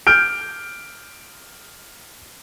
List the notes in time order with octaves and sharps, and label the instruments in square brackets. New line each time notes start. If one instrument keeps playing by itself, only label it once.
[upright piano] F6 G6 D7